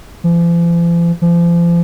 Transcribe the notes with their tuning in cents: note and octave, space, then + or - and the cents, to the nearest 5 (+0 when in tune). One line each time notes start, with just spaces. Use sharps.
F3 -45
F3 -35